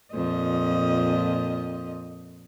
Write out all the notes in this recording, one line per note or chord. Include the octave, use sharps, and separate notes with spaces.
F2 A#2 D#5